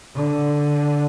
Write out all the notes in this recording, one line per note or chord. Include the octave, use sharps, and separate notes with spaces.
D3